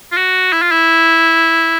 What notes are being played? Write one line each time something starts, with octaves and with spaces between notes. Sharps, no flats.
F4
F#4
E4
F4
E4